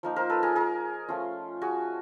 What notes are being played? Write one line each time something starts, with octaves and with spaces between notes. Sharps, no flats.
F3 A#3 D#4
A#4 C5
A4 B4
G#4 A#4
G#4 A#4
F3 A3 C#4 F4
F#4 G#4